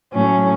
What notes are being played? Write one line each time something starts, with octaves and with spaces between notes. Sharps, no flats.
A2 F#3 A3 C#4